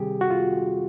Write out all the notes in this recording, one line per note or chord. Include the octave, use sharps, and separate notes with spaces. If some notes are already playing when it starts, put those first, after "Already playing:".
Already playing: C3 D#3 G3 C4 G4 G#4
F#4
F4